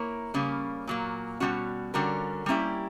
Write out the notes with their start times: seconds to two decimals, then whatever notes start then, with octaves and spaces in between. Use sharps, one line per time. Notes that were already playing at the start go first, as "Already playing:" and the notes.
Already playing: A#3 E4 A#4 C#5
0.34 C#3 G3 A#3 C#4
0.87 A#2 F#3 A#3
1.40 B2 G3 A#3 C#4 F#4
1.94 D3 G3 C#4 F#4 A#4
2.46 G3 A#3 C#4 E4 G4